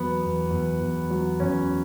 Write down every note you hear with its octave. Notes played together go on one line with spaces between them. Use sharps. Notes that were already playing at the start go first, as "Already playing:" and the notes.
Already playing: E2 F#3 B3
E2
E2
E2
F#3
E2 C#4